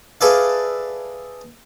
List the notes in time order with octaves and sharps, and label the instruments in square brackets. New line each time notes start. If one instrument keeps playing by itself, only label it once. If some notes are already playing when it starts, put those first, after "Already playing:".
[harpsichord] G#4 A4 B4 D5 E5 F5